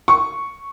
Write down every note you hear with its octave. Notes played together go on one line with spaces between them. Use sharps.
C#6